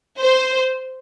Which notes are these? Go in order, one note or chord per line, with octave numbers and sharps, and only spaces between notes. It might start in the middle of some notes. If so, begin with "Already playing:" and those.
C5